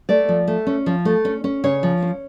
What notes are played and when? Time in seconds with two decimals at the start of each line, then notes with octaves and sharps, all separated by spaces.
0.09 A3 D5
0.29 F3
0.48 A3
0.67 C#4
0.86 F3
1.05 A3
1.25 C#4
1.44 C#4
1.64 C#3 C#5
1.83 F3
2.02 C#4